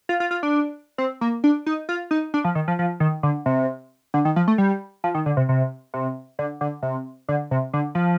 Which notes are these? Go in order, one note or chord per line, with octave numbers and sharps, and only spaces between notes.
F4
F4
F4
D4
C4
A#3
D4
D#4
F4
D#4
D4
F3
D#3
F3
F3
D#3
D3
C3
D3
D#3
F3
A3
G3
F3
D#3
D3
C3
C3
C3
D3
D3
C3
D3
C3
D3
F3